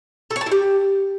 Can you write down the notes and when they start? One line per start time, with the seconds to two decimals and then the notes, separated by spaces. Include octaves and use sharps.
0.31 A4
0.36 C#5
0.41 A5
0.46 E4
0.52 G4